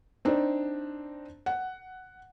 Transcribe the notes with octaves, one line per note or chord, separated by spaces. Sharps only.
C4 D4 D#4
F#5